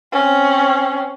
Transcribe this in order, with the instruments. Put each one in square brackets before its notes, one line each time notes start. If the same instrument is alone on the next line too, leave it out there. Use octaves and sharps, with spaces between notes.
[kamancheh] C4 C#4